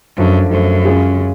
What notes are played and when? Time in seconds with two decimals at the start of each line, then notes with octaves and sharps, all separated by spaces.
0.17 F#2 F3 A3 D4
0.51 F#2 F3 A3 D4
0.85 C#3 G#3 C#4 F4 G#4
1.18 C#3